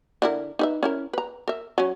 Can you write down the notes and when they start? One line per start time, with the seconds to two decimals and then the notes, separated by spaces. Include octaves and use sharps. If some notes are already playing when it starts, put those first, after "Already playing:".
0.22 D3 E4 A#4
0.59 D#4 B4 E5
0.83 C#4 E4 A#4
1.13 B4 A#5
1.48 A#4 E5
1.78 F#3 C#4